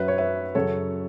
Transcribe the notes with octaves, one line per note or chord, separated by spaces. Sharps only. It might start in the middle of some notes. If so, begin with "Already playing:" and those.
Already playing: F#2 F#3 B4 E5
C#5
B4 E5
F#2 C#3 F#3 A4 C#5